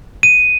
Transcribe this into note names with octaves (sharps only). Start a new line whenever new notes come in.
D#7